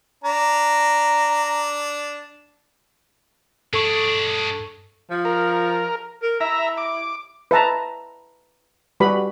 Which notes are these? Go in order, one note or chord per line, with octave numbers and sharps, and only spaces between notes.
D4 A#5
G2 D4 G#4 A4 C#6
F3
A#4
A#4
E4 E5 A#5
D6
B4 E5 A5 A#5
G3 F#4 G4 B4 B5